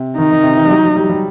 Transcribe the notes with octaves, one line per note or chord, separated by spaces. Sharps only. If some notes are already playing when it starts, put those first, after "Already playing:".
Already playing: C3
D#3 D#4
D#3
C3
E3
G3
F#3
F#3
G3
G3